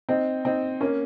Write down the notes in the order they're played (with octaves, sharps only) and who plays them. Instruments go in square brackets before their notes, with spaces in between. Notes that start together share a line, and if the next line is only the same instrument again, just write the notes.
[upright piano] C4 D#4
C4 D#4
A#3 C#4